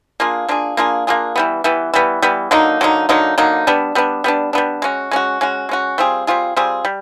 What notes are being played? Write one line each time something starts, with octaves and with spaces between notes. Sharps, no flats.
A#3 D4 F4 G#4
A#3 D4 F4 G#4
A#3 D4 F4 G#4
A#3 D4 F4 G#4
E3 G3 B3
E3 G3 B3
E3 G3 B3
E3 G3 B3
D3 F#3 A#3 D#4
D3 F#3 A#3 D#4
D3 F#3 A#3 D#4
D3 F#3 A#3 D#4
G3 B3 D4
G3 B3 D4
G3 B3 D4
G3 B3 D4
G#3 C#4 F#4
G#3 C#4 F#4
G#3 C#4 F#4
G#3 C#4 F#4
G3 C4 F4 G#4
G3 C4 F4 G#4
G3 C4 F4 G#4
G3